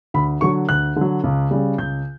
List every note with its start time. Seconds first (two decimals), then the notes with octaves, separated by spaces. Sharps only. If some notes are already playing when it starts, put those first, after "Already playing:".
0.14 D2 B5
0.41 D3 F#3 C#6
0.69 D2 F#6
0.96 D3 F#3
1.24 C#2
1.51 C#3 G3
1.78 C#2 G6